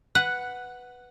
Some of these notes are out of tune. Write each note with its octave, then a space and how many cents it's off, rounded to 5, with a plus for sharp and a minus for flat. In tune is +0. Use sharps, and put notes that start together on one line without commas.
B4 +5 F#5 +0